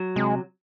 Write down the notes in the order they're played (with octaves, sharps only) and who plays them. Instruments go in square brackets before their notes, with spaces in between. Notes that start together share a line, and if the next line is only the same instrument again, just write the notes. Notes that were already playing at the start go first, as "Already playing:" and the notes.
Already playing: [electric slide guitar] F#3
[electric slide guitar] C3 [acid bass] G#3